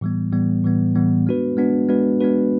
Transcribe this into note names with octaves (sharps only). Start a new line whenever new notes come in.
A2 E3 G3 B3
A2 E3 G3 B3
A2 E3 G3 B3
A2 E3 G3 B3
G#3 B3 D4 F#4 B4
G#3 B3 D4 F#4 B4
G#3 B3 D4 F#4 B4
G#3 B3 D4 F#4 B4